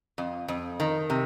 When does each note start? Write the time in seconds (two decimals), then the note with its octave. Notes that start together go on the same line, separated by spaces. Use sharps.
0.18 F2
0.48 F2
0.80 D#3
1.10 C3